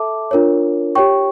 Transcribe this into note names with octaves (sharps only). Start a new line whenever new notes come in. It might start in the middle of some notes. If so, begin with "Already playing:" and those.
Already playing: A4 E5 A5 D6
D4 F4 A#4 C#5
G4 C#5 G5 C#6